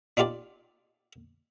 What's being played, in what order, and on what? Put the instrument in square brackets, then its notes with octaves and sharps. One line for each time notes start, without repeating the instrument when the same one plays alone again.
[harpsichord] D4 D#4 F4 G4 D5